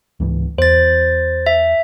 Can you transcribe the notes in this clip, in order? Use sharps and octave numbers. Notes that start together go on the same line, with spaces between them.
C#2 G#2 E3
E2 C5 A6
E5